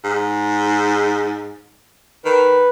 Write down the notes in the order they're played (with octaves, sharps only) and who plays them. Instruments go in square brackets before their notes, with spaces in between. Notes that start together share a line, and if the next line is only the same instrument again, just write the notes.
[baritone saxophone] G#2
[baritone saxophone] D#3 [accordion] B4